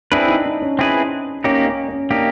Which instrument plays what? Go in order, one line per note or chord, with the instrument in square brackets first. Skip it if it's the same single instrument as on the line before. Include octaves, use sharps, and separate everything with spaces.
[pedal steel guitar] C4 E4 G#4 B4 [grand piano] D4
[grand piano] D#4
D4
C#4
[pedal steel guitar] C4 E4 G#4 B4
[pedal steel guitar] A#3 D#4 G4 [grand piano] C#4
[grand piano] C#4
C#4
[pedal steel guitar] A#3 D#4 G4 [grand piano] D4